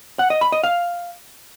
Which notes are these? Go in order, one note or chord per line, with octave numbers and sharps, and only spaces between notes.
F#5
D#5
B5
D#5
F5